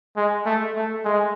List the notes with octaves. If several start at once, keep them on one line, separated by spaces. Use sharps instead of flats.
G#3
A3
A3
G#3